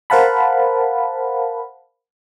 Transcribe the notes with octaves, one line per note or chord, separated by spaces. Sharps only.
A#4 C5 F5 F#5 A5 B5